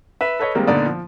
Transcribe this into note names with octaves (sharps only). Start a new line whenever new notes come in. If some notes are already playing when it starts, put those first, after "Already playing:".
B4 E5
A4 B4 C#5 D#5
D#3 G3 G#3 A#3 C4
A#2 D3 B3 D#4 D5 D#6
F3